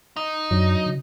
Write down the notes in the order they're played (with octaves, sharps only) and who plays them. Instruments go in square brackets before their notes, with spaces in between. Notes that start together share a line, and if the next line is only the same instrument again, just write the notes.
[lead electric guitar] D#4
[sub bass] F#2 [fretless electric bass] F#3 D4
[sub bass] C#3